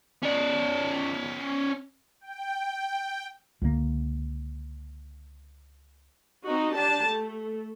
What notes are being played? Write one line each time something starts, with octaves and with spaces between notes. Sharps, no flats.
C#4 D5
G5
C#2 D3 F3 A#3
C4 D#4 F#4
D4 G4 A5
A3